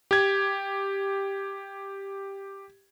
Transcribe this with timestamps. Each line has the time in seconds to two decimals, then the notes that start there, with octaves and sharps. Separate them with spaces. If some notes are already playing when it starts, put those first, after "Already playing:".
0.11 G4 G#6